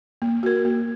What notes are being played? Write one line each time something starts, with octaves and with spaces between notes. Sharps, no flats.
A#3
F#4 A#4
A#3